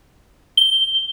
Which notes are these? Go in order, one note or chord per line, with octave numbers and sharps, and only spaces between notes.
G7